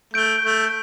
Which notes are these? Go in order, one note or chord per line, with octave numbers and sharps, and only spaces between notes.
A3 G6 D7 G7
A3